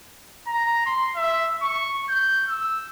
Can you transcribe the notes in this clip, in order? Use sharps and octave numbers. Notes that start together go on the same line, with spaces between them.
A#5
C6
E5
C#6
G6
E6